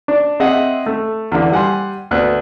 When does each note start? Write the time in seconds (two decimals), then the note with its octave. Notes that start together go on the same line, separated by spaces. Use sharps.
0.08 D4
0.40 C4 G#4 D#5 E5 F#5
0.86 A3
1.32 E2 D3
1.52 G3 F#5 G#5 C6
2.11 D2 B3 F#6